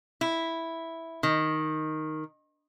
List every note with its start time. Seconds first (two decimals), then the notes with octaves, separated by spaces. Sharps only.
0.21 E4
1.23 D#3